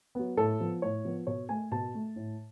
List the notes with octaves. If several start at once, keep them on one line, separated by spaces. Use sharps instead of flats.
F#3 B3
A2 A4
F3 B3
A2 C#5
F3 B3
B2 C#5
A3 G#5
B2 A5
A3
A2